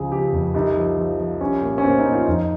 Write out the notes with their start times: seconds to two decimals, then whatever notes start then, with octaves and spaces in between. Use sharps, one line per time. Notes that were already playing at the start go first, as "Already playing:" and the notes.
Already playing: C#2 C#3 F3 G#4
0.11 F3 G4
0.32 F2
0.54 C2 D#4
0.76 F3
0.97 F3
1.19 F3
1.41 C2 C#4
1.62 A#2
1.78 C#4
1.83 A#2 C4
1.98 D#4
2.06 A#2
2.13 F4
2.27 F2 D#4